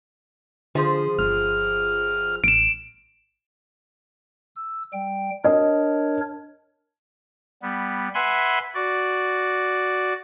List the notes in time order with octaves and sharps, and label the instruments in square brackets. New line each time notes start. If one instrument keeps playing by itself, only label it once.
[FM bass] D3 [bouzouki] F3 G#4 C5
[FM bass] G1 [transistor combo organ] F6
[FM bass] A1 [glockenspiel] D7 E7
[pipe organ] E6
G3 G5
[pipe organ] D4 A#4 C#5 [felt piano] D#5
[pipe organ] G3 B3
B4 E5 F#5 G#5 B5 C6
F#4 D5